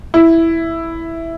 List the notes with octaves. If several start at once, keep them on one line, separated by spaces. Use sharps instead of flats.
E4